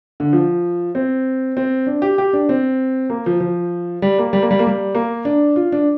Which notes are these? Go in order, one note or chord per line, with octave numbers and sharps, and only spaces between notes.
D3
F3
C4
C4
D4
G4
G4
D4
C4
A#3
F3
F3
G3
A#3
G3
A#3
G3
A#3
G3
A#3
D4
F4
D4